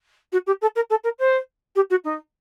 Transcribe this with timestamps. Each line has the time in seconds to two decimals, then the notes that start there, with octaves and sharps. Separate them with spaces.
0.32 F#4
0.46 G4
0.61 A4
0.75 A#4
0.90 A4
1.04 A#4
1.19 C5
1.75 G4
1.90 F#4
2.04 D#4